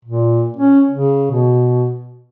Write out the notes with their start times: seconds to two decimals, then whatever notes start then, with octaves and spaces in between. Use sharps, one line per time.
0.05 A#2
0.57 C#4
0.91 C#3
1.32 B2